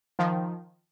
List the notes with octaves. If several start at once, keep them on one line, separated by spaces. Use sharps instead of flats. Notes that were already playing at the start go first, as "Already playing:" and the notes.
D#3 F3